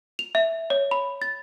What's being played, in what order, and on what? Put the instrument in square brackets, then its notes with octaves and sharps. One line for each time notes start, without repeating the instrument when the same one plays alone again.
[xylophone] F7
E5
C#5
B5
A6